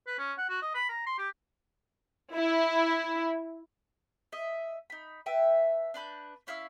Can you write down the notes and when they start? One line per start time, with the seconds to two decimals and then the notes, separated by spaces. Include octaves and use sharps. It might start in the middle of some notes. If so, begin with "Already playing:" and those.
0.07 B4
0.19 C#4
0.38 F#5
0.49 F#4
0.62 D#5
0.75 B5
0.89 A#5
1.06 C6
1.18 G4
2.35 E4
4.32 D#5 E5
4.90 D#4 B5
5.26 B4 E5 G5 A5
5.94 D4 B4 B5 G6
6.47 C#4 E4 F5 E6